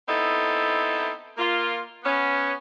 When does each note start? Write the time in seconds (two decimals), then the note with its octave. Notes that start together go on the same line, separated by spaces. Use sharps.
0.08 B3 C4 D#4 E4 A4
1.38 A#3 F4
2.04 B3 C#4